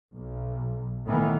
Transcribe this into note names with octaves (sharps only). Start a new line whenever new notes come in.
B1
A2 D#3 E3 B3